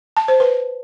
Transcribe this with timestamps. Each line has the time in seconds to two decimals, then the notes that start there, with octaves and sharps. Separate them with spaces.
0.17 A5
0.28 C5
0.40 B4